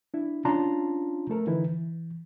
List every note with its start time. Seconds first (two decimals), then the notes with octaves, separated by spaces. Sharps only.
0.14 D4 E4
0.45 C#4 D4 F4 A5 A#5 C6
1.30 A3 A4 A#4
1.46 D3 E3 D#4 E4 B4
1.69 E3